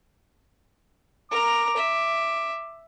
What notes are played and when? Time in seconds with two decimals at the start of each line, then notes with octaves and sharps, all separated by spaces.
1.31 A#4 A#5 D6
1.77 E5